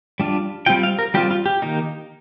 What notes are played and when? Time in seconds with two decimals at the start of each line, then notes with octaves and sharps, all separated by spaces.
0.20 G3 D4 F4
0.66 G3 C4 F4 G5
0.83 F5
0.99 A#4
1.14 G3 C4 F4 G4
1.31 F4
1.46 G4
1.62 D#3 A#3 D#4